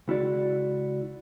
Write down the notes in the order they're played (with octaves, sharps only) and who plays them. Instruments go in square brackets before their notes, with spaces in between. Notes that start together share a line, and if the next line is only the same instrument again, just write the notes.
[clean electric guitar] C#2 E4 F#4 D5